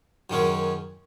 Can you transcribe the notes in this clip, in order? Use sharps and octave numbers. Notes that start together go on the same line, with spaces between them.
F#2 D#3 G#3 C#4